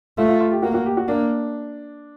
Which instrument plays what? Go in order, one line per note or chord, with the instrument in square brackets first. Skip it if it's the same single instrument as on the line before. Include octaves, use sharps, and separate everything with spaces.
[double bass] A3 [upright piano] F4
[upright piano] F4
F4
G4
[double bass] A#3 [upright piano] F#4
[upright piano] F#4
G4
F#4
[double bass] A#3 [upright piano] D4